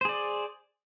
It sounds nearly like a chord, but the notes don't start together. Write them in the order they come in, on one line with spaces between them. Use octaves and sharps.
C5 G#4 D5